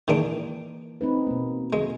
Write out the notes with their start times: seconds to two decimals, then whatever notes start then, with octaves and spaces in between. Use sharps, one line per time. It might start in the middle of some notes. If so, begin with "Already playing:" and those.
0.08 D#3 E3 G#3 A#3 D4
1.01 C4 D#4 B4
1.27 B2 A#3
1.73 G#3